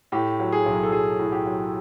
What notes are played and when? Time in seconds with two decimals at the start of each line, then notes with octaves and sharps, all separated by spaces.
0.12 A2 G4
0.40 F#3
0.52 G#4
0.66 B1
0.83 A4
0.92 B1 G#4
1.19 A2
1.32 G4
1.46 F#3